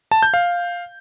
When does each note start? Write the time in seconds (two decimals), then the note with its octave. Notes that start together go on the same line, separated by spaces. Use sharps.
0.12 A5
0.23 G6
0.34 F5